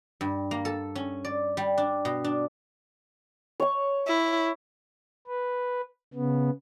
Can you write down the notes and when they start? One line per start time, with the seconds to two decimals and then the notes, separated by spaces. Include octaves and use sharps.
0.21 G2
0.51 A#3
0.65 A4
0.95 C#4
1.25 D5
1.57 G3
1.78 D4
2.05 B2
2.24 D4
3.60 C#5 C#6
4.07 E4
5.27 B4
6.14 C#3 B3